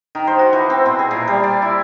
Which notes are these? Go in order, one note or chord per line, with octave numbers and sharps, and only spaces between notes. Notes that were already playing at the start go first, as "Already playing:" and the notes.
D#3
C5
F#4
E3
C4
B2
G#4
A#2
G3
D5
E4